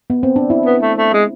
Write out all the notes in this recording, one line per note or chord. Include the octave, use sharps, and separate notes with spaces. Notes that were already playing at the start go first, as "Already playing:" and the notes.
B3
C4
D4
E4
B3
A3
A3
G#3